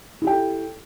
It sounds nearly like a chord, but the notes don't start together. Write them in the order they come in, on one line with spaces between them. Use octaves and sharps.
E4 G4 G5 A4